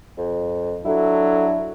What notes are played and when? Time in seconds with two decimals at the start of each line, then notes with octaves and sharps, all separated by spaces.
0.18 F2
0.85 F#3 D4 E4 A4